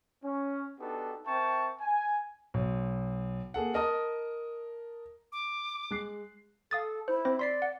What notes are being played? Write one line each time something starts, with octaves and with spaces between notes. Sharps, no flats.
C#4
B3 D4 D#4 F#4 G4 A4
C4 A#4 E5 G5 A5 C#6
G#5
B1
A#3 G#4 A4 F#5
A#4 D#5 A5 D#6
D6
G#3 F#6 C7
A4 F5 D#6 A6
E4 C5
C4 C5 A#6
D5 C6 B6 C7
F#5